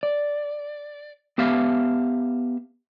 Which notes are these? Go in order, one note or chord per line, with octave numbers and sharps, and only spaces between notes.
D5
B3 G4 E5 F5